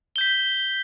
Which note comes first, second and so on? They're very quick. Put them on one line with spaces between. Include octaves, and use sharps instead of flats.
G7 G6 B6